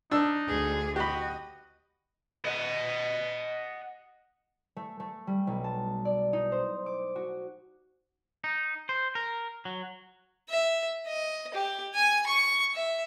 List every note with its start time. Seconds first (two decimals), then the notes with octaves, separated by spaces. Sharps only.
0.11 D4 D#4 E6
0.47 D2 G#4
0.96 F#4 G4 D#5 B5
2.45 D#5 F#5
4.76 A3
5.00 A3
5.27 G3
5.47 B1
5.64 A5
6.05 D5
6.33 D#4
6.52 C5
6.86 D6
7.16 F#4
8.44 D#4
8.89 C5
9.15 A#4
9.65 F#3
10.50 E5
11.07 D#5
11.54 G4
11.95 G#5
12.26 C#6
12.75 E5